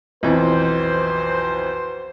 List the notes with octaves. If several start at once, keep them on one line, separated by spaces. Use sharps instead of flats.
B1 F2 E3 F#4 B4 C5